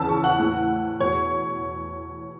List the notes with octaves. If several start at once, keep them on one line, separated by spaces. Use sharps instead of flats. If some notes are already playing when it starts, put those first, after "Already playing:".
Already playing: E2 C#3 E3 A5 E6
C#6
F#5
A2 E3
E2 B2 C#5